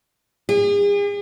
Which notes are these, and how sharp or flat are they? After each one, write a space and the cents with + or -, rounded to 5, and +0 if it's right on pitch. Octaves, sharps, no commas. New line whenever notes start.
G#4 -40